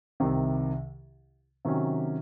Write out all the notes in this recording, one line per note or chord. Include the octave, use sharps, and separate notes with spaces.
C2 C3 D#3
C3 D#3 F#3 C#4